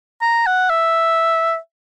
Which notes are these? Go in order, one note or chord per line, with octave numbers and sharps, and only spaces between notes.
A#5
F#5
E5